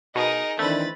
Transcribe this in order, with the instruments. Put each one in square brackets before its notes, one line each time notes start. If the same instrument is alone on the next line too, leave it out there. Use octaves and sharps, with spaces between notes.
[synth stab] B2 [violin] D#4 G#4 [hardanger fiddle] A#4 D#5
[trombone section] D#3 E3 D4 [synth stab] A3 [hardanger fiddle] C4 B4 [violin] B5 A6